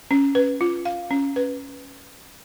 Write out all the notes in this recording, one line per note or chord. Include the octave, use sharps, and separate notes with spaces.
C#4
B4
F4
F5
C#4
B4